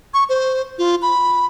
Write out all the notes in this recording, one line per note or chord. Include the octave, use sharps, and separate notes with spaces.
C#6
C5
F4
B5